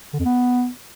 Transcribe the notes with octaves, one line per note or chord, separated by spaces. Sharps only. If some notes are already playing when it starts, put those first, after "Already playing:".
D3
F2
B3